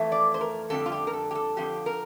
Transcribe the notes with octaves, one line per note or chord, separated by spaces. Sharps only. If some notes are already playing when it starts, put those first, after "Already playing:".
Already playing: F2 E3 A3
D5
C5
A#4
F2 D3 G3 A4
F4
G4
A#4
A4
G4
A4
F2 D3 F3 G4
A#4